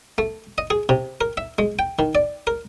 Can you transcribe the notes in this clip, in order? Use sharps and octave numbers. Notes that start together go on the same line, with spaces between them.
A3
D#5
G#4
C3
A#4
E5
G#3
G5
D#3
D5
A#4